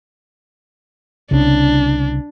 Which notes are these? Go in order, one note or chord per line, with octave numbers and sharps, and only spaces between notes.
C2 C#3 D4